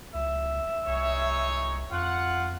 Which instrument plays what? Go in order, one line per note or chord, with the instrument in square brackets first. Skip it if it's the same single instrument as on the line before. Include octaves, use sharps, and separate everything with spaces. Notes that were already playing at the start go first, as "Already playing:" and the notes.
[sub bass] C#2 [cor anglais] E5
[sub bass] C2 [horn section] D#4 G#4 C#5
[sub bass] F2 [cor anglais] F4 [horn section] F#5